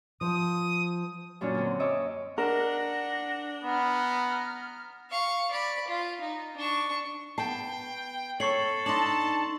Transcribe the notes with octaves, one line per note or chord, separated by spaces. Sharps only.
F3 D#6
F#2 A#2 F#3 D4
D3 C4
C#5 D#5 E5 D6 E6
D4 A#4 F#5 A#6
B3 A#5 F6
F5 C#6
D5 B5
F4
D#4
D4 C#6
B3 G5 A5 C7
A4 C#5 C#6 C7 F#7
D4 D#4 A5 C6 F#7